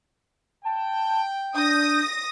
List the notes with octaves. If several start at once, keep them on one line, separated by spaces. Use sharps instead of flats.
G5 A5
D4 D#6 G6 A#6